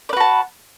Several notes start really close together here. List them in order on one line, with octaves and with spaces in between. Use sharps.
D5 B4 F#4 A5